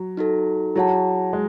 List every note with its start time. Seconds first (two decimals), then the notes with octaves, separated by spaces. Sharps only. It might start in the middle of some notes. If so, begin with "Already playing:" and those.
Already playing: F#3
0.17 D#4 F#4 A4
0.76 F#3 E4 G#4 C#5 F#5 A5
1.33 G#3